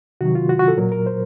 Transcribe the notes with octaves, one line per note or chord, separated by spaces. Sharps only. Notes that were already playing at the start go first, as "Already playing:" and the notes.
C3 D#3 F#3 F#4
F4
F#4
F#4
A4
A#2 F#3 A#4
A#4
C5